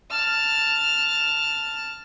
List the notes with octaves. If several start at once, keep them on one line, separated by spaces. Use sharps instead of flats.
A5 F6